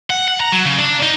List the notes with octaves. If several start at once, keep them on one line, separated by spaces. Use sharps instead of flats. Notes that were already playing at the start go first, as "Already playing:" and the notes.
F#5
F#5
A#5
F#3
C#3
D4
D#4